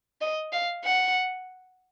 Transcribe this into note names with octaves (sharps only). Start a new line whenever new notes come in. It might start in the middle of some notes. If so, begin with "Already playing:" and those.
D#5
F5
F#5